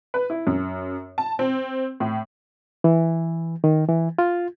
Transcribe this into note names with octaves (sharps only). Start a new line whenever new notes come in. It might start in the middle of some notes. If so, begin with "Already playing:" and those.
B4
E4
F#2
A5
C4
A2
E3
D#3
E3
F4